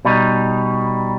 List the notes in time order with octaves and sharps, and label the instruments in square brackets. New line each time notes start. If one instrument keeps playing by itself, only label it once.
[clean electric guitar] B2 G3 D#4